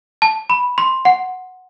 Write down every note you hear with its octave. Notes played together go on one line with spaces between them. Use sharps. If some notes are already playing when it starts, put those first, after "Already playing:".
A5
B5
C6
F#5